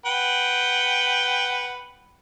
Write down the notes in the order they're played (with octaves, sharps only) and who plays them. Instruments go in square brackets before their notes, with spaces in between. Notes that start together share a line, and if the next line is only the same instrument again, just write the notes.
[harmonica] B4 F#5 G5